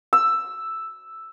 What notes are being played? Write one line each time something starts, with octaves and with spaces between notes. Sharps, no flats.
E6